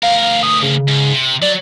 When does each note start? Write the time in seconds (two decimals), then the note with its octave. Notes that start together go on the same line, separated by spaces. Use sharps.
0.03 D2 A#4 F5
0.43 D#6
0.63 C#3
0.88 G#2
1.13 C3
1.42 F#3 D5